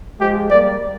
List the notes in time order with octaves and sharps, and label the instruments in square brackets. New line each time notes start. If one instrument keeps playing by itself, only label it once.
[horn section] F3 G#3 [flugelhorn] G4
[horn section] G3 A#3 [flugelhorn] D5